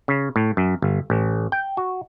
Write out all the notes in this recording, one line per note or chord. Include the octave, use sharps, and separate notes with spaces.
C#3
A2
F#2
G1
A1
G5
F#4